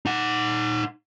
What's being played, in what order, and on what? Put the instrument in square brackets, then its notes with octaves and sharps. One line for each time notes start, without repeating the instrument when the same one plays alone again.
[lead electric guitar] D#4 F#5